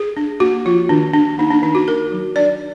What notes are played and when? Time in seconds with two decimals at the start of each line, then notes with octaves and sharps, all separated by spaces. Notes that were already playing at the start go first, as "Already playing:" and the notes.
Already playing: G#4
0.17 D4
0.40 A#3 F#4
0.65 F3 F4
0.89 D#3 D4
1.14 D4
1.38 A#3 D#4
1.51 D4
1.62 D#3 D#4
1.75 F#4
1.88 D4 A#4
2.12 F#3
2.36 D4 D5